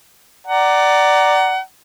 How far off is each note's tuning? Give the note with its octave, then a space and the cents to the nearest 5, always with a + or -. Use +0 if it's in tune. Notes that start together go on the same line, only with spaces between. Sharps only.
D5 +0 F#5 +25 A#5 +0